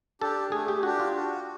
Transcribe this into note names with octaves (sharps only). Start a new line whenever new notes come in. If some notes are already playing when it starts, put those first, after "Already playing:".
D4 G4 A4
A3 G#4
G4
D4 F#4 G4
F4
F#4